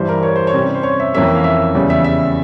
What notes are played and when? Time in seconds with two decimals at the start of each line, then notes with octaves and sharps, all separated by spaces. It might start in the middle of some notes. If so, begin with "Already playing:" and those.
Already playing: G2 E3 G3 C5
0.09 A#4
0.23 C#5
0.36 C5
0.47 C#5
0.54 C3 G3 C#4
0.74 C5
0.83 C#5
1.00 E5
1.14 F2 E3 A#3 C#4 E5
1.35 F5
1.44 E5
1.75 E2 C#3 G3
1.90 E5
2.04 E5